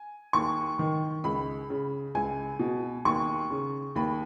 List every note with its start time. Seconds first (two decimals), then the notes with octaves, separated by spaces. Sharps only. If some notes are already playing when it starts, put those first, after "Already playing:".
Already playing: G#5
0.33 D#2 C#6
0.79 D#3
1.24 C#2 B5
1.70 C#3
2.15 C#2 G#5
2.59 B2
3.05 D#2 C#6
3.51 C#3
3.95 D#2 B5